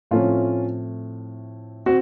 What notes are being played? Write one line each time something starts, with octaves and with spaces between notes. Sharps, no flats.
A2 F3 A3 C4 C#4 F4
C4 F#4